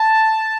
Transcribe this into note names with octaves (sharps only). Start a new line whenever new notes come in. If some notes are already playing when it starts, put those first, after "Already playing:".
Already playing: A5